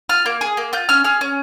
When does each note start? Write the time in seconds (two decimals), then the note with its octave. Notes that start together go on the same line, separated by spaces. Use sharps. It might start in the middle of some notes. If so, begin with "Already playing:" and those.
0.09 F4 F6
0.26 A#3
0.41 G#4
0.57 A#3
0.73 F4 G6
0.89 C#4 F6
1.04 G#4 F6
1.21 C#4